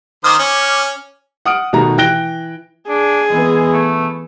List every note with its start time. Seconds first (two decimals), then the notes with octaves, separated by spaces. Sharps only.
0.24 D#3 C5 D6 D#6 F6
0.39 C#4
1.46 F#5 D#6 F6 D7
1.73 B2 D#3 A3 F#4 A#5
1.98 E3 G5 F#6 A#6 D7 G7
2.89 D4 G#4
3.30 E3 G#3 B3
3.73 A3